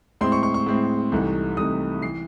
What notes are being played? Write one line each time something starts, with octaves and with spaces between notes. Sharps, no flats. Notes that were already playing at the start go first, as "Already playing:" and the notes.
A2 G#3 C4 E4 C6
C#6
C#6
C#6
A2 G#3 C4 E4
C2 C3 E3 A3 D#4
C2 C3 E3 A3 D#4 D#6
E3 C7